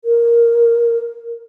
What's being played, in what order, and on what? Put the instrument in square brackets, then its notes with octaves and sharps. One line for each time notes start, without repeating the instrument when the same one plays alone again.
[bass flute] A#4